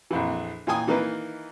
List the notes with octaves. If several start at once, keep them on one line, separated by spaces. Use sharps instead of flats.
A#1 F2 E3
A#2 E3 G5 G#5 D#6
D#3 E3 A#3 D#4 B4 D#5